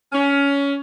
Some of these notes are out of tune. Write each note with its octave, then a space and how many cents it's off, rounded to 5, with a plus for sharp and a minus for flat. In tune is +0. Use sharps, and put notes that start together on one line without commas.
C#4 +20